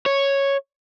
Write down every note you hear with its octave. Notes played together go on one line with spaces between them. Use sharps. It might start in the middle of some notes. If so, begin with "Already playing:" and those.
C#5